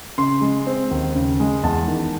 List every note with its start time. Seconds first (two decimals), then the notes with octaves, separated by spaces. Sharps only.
0.18 C#3 C6
0.41 G#3
0.67 C4
0.91 D#2
1.15 C#3
1.40 G#3
1.63 E2 A5
1.88 D#3